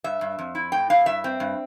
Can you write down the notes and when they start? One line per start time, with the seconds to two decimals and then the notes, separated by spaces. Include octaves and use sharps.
0.04 G2 E5
0.21 G2
0.39 F2
0.55 E4
0.72 A2 G5
0.90 E4 F5
1.06 G2 E5
1.24 C4
1.40 G2